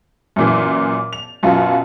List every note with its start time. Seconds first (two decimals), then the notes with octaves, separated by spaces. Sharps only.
0.36 F#2 A#2 E3
1.13 F7
1.43 F#2 B2 F4